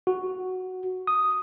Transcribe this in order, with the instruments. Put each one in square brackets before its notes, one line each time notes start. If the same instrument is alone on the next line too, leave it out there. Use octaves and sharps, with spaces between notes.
[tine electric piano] F#4
D#6